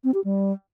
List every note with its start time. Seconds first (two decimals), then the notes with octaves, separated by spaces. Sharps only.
0.04 C4
0.14 G4
0.24 G3